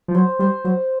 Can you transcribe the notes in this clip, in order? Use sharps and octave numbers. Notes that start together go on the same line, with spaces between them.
F3
F#3 C5
G3 C5
F#3 C5